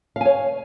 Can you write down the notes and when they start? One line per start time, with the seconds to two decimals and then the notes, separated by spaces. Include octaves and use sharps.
0.16 F5
0.21 G#5
0.26 C#5